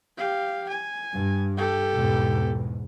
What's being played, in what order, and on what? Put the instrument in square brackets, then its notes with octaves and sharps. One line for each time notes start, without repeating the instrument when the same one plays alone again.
[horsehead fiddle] G4 F5
G#5
[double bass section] G2
[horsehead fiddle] G4 A4
[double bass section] E2 G#2 B2